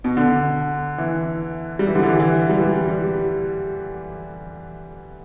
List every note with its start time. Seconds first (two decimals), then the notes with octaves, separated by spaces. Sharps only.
0.04 B2
0.17 D3
0.98 E3
1.79 G3
1.87 E3
1.95 D3
2.03 E3
2.20 E3
2.50 G3
2.60 E3
2.88 G3